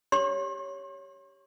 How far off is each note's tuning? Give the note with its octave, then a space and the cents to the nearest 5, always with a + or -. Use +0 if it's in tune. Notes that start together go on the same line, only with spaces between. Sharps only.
G4 +0 C#5 +0 C6 +40